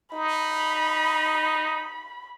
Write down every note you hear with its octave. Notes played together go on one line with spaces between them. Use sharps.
D#4 B5